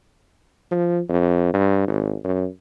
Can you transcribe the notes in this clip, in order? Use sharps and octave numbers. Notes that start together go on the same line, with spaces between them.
F3
F2
G2
G#1
F#2